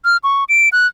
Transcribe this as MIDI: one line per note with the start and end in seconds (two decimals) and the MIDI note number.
0.05 0.17 89
0.24 0.44 85
0.49 0.69 98
0.72 0.87 90